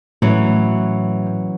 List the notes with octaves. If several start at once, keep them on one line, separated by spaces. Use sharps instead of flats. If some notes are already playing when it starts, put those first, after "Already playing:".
A2 E3 F#3 C#4